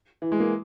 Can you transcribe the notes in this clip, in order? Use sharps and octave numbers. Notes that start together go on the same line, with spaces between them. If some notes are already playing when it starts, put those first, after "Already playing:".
E3
G#3
A#3